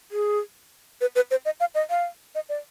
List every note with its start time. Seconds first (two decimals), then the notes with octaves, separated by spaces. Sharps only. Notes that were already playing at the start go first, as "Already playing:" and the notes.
0.12 G#4
1.01 B4
1.16 B4
1.31 C5
1.45 D#5
1.60 F5
1.75 D#5
1.90 F5
2.35 D#5
2.49 D5